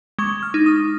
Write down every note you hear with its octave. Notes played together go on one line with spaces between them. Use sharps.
G#3 C#6
F6
D#4
D#6